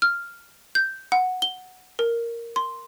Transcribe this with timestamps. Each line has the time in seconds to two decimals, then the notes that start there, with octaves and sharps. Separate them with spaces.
0.02 F6
0.75 G6
1.12 F#5
1.42 G7
1.99 A#4
2.56 C6